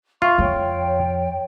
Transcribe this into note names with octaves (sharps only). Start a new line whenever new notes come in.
F4 E5 C#6
F2 C#5 G5